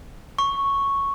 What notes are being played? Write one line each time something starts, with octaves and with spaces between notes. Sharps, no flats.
C#6